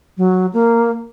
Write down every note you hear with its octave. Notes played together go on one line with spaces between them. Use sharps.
F#3
A#3